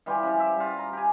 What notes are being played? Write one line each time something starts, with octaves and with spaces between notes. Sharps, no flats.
E3 G3 F4 G4
C#3 F3 G3
G4 E5
G3 F4
A#5
G4 G#5